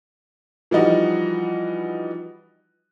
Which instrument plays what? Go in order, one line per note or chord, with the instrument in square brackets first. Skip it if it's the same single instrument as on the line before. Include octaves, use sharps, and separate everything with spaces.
[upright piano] E3 F3 G3 D#4 F#4 D#5